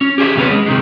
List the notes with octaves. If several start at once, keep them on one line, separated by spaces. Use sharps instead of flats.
C#4
G4 G#4 C5 E5
D#2 C3 B3 C#4 B4
G#3
C3 D#3 G#3